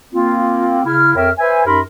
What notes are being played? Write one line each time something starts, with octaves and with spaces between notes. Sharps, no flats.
A#3 C4 F4
C#3 E4 F6
F2 A#4 C#5 E5 G5 F6
B4 C5 E5 G#5
F#2 D#4 G4 A#4 B5 C6